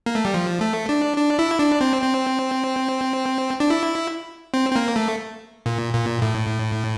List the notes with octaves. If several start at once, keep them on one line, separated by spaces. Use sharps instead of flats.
A#3
A3
G3
F3
A3
D4
D4
E4
D4
C4
C4
D4
E4
C4
C4
A#3
A3
A#2
A#2
A2